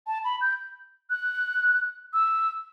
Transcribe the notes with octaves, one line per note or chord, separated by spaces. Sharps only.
A5
B5
G6
F#6
E6